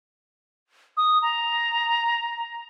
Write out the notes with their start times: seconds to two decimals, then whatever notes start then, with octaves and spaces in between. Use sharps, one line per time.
0.97 D#6
1.22 A#5